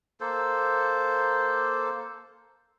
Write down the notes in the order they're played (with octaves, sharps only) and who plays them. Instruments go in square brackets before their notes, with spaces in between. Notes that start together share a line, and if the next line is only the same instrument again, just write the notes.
[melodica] A#3 A4 C5